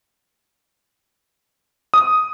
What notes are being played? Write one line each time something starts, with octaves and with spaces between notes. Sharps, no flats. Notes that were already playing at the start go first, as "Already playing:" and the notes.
D#6